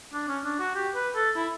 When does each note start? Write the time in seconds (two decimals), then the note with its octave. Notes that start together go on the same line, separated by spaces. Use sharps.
0.13 D4
0.28 C#4
0.44 D4
0.59 F#4
0.75 G4
0.95 B4
1.15 A4
1.36 E4